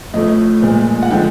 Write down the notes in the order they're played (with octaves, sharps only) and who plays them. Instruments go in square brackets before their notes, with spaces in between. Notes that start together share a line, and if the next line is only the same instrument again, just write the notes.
[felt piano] A2 F3 A3 D#5
A#2 F3 G#3
F#5
D3 F3 G#3 G5